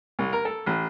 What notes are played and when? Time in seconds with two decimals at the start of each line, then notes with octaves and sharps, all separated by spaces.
0.19 C2
0.33 A#4
0.45 A4
0.66 A1